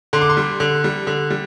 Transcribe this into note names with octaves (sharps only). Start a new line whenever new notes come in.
D3 C6
D6
C6
G3
D3
G3
D3
G3